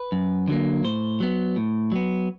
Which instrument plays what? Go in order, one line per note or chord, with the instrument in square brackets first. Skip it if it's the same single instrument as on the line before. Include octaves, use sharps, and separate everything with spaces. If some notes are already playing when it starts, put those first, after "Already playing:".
Already playing: [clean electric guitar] B4
F#2
D3 F#3 A#3
A2 C5
F#3 B3
A2
F#3 B3